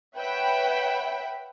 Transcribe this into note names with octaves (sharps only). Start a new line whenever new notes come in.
B4 C#5 E5 F#5 G5 B5